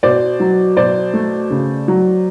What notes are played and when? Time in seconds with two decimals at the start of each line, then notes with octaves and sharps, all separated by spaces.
0.03 B2 C5 D5
0.40 F#3
0.77 B2 C5 D5
1.14 A3
1.50 C#3
1.88 F#3